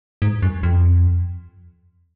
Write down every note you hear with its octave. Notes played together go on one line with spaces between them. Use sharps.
G#2
F#2
F2